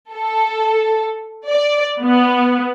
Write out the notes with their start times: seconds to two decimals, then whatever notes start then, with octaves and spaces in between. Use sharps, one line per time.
0.12 A4
1.46 D5
2.02 B3